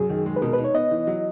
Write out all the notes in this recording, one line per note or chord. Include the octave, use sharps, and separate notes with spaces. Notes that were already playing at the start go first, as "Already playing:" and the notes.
Already playing: F#2 G#4
D#3
G#3
B4
B2 A#4
B4
D#4
C#5
B3 D#5
E3
F#3